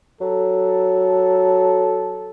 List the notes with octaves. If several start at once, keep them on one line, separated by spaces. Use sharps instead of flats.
F#3 A4